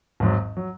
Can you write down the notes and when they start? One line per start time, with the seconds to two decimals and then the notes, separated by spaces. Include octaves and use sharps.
0.20 G#1 G#2 F#3
0.57 F#3